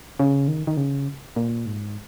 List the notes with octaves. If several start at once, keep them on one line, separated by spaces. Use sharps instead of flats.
C#3
D#3
D#3
C#3
A#2
G#2